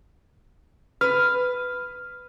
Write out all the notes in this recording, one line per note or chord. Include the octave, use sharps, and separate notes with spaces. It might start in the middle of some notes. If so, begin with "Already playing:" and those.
B4 F6